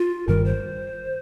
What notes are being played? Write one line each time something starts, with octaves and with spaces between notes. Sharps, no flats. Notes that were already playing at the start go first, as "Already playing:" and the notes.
Already playing: F4
G1 G2 D#3 G3 A#4
C5